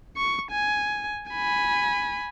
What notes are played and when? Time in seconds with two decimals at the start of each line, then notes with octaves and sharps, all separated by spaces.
0.17 C#6
0.51 G#5
1.31 G#5 B5